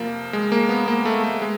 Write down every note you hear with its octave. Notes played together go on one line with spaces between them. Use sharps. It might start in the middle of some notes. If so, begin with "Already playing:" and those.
Already playing: F2 C3 F3 A#3
G#3
A#3
B3
A#3
A3
A3
G#3